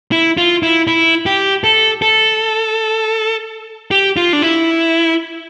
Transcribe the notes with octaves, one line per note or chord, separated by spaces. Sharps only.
E4
F4
E4
E4
G4
A4
A4
G4
F4
D4
E4